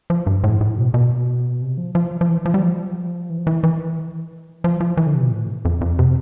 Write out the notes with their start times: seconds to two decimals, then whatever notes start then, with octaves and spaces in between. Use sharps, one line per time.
0.10 F3
0.27 G2
0.44 A2
0.61 A2
0.77 B2
0.94 B2
1.62 C3
1.78 F3
1.95 F3
2.21 F3
2.29 E3
2.46 F3
2.54 G3
2.63 F3
3.30 E3
3.39 F3
3.47 E3
3.63 E3
4.64 F3
4.80 F3
4.97 E3
5.07 D3
5.15 C3
5.22 B2
5.31 A2
5.65 F2
5.81 F2
5.99 C3